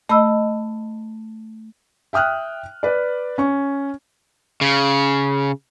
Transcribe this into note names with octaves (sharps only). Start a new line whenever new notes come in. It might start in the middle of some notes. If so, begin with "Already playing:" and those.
A3 D#5 B5 E6
E5 G5 D#6 F6 F#6
B4 D5
C#4 C#6
C#3